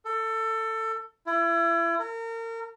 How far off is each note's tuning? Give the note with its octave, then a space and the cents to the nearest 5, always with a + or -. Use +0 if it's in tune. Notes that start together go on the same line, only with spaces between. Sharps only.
A4 +20
E4 +35
A#4 -35